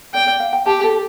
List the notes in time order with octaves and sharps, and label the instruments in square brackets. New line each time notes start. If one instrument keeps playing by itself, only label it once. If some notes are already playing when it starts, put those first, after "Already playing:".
[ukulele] D5 [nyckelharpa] G5
[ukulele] D5
F5
G5
[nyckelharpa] G4 [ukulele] A5
[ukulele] A4